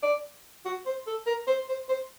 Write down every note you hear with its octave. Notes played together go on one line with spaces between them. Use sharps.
D5
F#4
C5
A4
A#4
C5
C5
C5